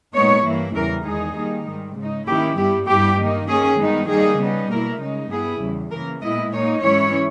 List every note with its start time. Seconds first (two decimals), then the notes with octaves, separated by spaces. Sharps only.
0.14 A#2 G#3 B3 D#4 C#5
0.45 G2 E3 A#3 E4
0.75 E2 C#3 E3 G3 A#4
1.05 E2 D#3 G#3 D#4 G#4
1.36 D#3 G3 A#3 D#4
1.66 G#2 D#3 G3
1.96 C#3 G#3 D#4
2.27 D#3 A#3 C#4 E4 G4
2.58 G2 G3 B3 E4 G4
2.88 G2 G3 B3 E4 G4
3.18 D#3 A#3 D#4
3.48 D#3 A#3 C#4 G#4
3.79 G2 D#3 G#3 B3 D#4
4.09 D#3 G3 A#3 D#4 G#4
4.39 C#3 G3 B3 D#4
4.70 B2 A#3 E4 A#4
5.00 C#3 G#3 D#4
5.30 G2 G3 B3 E4 G#4
5.61 E2 C#3 G3
5.91 C#3 E3 A#3 A#4
6.22 A#2 G#3 B3 E4 D#5
6.52 A#2 A#3 D#4 C#5
6.82 G#2 E3 G#3 C#4 E4 C#5